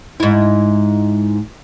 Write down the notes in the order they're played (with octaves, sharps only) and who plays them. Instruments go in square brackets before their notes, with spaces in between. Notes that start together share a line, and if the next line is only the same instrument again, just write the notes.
[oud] G#2 E4